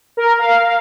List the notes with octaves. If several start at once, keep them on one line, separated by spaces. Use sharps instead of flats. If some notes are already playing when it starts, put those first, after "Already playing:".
A#4
F5